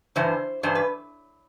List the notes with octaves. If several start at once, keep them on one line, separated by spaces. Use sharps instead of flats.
G2 E3 C5
G2 E3 C5
B4